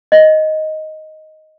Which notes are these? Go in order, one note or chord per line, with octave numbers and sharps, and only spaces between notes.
D#5